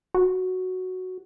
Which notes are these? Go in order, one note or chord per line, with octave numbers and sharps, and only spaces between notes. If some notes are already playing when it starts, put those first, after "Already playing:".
F#4